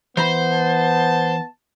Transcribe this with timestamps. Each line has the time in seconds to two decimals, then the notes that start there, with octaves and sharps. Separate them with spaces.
0.17 E3 B3 C5 A#5 B5
0.51 A5